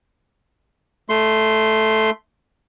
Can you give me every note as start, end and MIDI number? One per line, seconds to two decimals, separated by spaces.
1.09 2.10 57
1.09 2.10 84